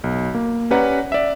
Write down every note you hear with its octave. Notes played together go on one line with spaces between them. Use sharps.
B1
A#3
C#4 G4 B4 D5 F#5 A#5
D5 E5